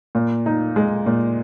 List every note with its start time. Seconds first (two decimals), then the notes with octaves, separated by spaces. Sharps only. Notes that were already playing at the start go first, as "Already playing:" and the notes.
0.15 A#2
0.46 D#4
0.76 G#3
1.06 A#2